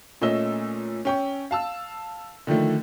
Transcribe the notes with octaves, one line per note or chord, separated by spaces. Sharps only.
A#2 A3 C#4 D#5 E6 G7
C#4 G5 C#6
F5 A5 E6
D3 D#3 F3 A3